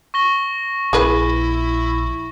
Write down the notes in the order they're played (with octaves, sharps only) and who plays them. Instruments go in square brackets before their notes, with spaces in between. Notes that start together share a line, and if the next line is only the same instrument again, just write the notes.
[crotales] C#6 A#6 G7
[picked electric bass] A#1 [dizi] E4 [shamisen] G#4 B4